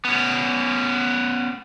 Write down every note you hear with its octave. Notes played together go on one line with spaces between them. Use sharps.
B3 C#4